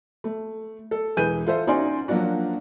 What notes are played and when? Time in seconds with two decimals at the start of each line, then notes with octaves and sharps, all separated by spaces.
0.24 A3
0.91 A4
1.17 E1 E3 G#4 B4 G6 D#7
1.47 F4 A4 C5 E5
1.67 C#4 D#4 F#4 D5 G#5 C6
2.08 F3 F#3 A#3 D4 F#4